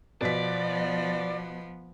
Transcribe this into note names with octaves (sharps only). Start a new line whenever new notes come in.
B2 F3 B3 D5 B6